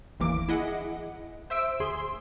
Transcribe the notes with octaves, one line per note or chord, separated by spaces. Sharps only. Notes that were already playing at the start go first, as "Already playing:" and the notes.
G1 D#2 E3 A#3 D6 D7
E4 G#4 D#5 F#5
C5 E5 E6 D7
D2 G#4 C6